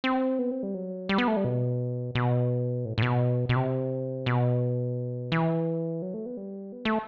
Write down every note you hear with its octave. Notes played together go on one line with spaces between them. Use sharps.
C4
B3
C4
G3
F#3
G3
B3
A3
G3
B2
B2
A2
A2
B2
B2
C3
B2
E3
F#3
A3
B3
G3
B3
A3